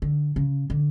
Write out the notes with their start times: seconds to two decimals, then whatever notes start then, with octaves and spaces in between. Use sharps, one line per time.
0.02 D3
0.36 C#3
0.70 D3